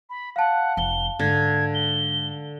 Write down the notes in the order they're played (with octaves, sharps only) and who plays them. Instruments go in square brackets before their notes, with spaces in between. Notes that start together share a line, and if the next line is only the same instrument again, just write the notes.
[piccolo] B5
[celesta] F5 A5 [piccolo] F#5
[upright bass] F1 F3 [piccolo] G7
[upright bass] G#2 G#3 [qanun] D3 [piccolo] G#6
[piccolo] G7